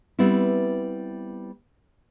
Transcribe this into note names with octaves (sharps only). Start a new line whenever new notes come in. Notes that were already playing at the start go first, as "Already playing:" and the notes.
G3 B3 C4 E4